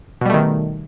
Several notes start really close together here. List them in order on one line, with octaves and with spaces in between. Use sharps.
B2 G3 A3 D#3